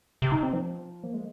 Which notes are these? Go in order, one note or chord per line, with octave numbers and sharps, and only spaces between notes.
C3
D#4
C4
F3
A#3
G#3